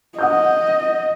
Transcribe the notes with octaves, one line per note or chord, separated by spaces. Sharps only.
D#5 F#5 D#6 G6